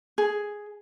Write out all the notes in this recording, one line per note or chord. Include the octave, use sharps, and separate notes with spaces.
G#4